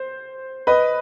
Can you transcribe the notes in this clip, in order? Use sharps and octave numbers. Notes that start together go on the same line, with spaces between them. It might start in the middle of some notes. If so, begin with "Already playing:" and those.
Already playing: C5
B4 D#5